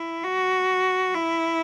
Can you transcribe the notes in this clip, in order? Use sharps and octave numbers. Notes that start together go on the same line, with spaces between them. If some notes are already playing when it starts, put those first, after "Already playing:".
Already playing: E4
F#4
E4